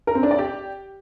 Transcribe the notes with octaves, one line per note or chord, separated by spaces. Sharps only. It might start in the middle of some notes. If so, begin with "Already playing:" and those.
A#4
C4
D4
D5
G4